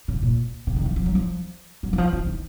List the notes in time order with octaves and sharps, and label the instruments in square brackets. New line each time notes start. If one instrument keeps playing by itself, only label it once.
[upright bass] C#3
A#2
C#3
D#3
E3
F3
F#3
F3
F#3
E3
F3
E3
D#3